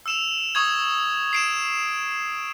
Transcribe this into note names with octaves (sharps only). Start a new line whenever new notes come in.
E6 E7 F7
C#6 D#6 G#6
C7 D7 E7